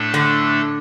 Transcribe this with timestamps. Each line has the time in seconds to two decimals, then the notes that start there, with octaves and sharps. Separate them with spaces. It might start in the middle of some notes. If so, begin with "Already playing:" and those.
Already playing: A2 A3 D4 A4
0.14 D3